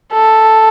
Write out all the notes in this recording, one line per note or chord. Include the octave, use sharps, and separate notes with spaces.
A4